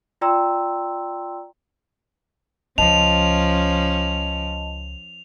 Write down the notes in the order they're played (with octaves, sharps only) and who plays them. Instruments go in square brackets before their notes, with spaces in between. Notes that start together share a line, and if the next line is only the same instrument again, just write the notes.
[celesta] F4 D5 G5 A#5 C6 E6
[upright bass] C#2 [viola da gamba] F3 C#4 [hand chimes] D#5 A5 [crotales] F7